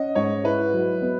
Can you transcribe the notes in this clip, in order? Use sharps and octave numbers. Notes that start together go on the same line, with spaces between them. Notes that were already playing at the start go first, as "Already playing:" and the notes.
Already playing: C#4 D#5 F#5
G#2 C#5
E4 B4
F#3
B3